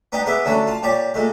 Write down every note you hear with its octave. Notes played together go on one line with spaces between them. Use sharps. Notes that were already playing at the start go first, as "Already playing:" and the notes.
B3 D4 D#4 G4 D#5
G#3 B3 B4 E5 D6
D3 F#3 A3 C#4 A4
F4 A5
A#2 G4 C#5 D5
A#2 G#3 A3